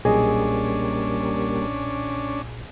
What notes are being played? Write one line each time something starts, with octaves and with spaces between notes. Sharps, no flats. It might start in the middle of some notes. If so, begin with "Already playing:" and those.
B1 A#2 G3 A#3 C#4 D4 G#4 D#5